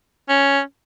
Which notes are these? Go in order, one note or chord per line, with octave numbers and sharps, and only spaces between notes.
C#4